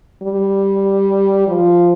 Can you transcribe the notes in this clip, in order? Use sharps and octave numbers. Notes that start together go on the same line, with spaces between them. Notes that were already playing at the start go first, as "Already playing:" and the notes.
G3
F3